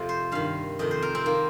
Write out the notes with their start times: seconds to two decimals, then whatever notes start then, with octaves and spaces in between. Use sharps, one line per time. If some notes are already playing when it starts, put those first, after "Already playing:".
Already playing: F2 C3 F3
0.09 C5
0.32 G2 D#3 F5
0.79 F2 C3 D#3 D#5
0.91 C5
1.02 A#4
1.15 C4
1.25 D#3 A#3